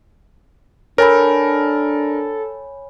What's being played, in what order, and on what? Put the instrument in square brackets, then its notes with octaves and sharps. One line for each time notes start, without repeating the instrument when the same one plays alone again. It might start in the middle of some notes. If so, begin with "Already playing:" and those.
[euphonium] D4 [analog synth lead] A4 [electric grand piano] A#4 [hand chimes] C#5 G#5 B5